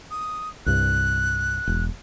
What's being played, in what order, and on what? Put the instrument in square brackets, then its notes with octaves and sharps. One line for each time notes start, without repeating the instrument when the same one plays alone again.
[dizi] D#6
[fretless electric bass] C2 G2 [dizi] F#6
[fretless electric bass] E1